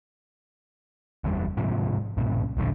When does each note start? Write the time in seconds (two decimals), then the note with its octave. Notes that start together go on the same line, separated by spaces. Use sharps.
1.24 F#1 E2 G3
1.57 G#2 C3 F3
2.17 B1 G2 A#2 C#3
2.57 D#1 A#1 G#2 D3